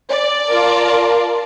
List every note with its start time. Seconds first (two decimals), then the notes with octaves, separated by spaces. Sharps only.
0.10 D5
0.46 F4 A#4 A5